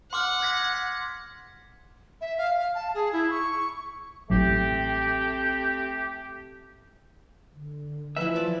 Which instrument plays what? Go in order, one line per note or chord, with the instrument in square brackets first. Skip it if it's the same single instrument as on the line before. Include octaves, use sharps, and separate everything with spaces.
[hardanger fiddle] F#5 [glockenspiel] C6 D6 F6
[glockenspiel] G#6 A#6 B6
[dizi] E5
F5
F5
A5
G#4
E4
C#6
[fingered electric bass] A1 A2 F#3 [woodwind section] A3 C4 G4
[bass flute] D3
[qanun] E3 B4 [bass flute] F3 [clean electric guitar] E5
[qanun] D5